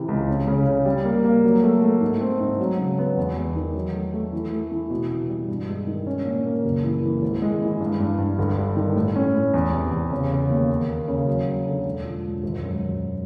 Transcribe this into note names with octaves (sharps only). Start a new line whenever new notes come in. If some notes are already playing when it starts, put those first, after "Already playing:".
Already playing: C3 E3
C#2
C#3
C#3
C#3
G3
A#3
A#3
F#3
A3
A3
G#2
C4
G#2
F#3
C#3
B3
E2
E2
D#3
F#3
A3
A3
E3
A3
E3
B2
B2
G3
G2
G#3
D#3
C#4
A#2
A#3
F#1
E3
E3
G#1
G#3
E3
G2
G2
G2
G1
G3
D#3
A2
C#4
A2
E2
C3
E2
C#3
C#3
D#2
A#3
A#3
C#3
F#3
F#3
D3
E1
F3
E1
G#1
F#2
G#1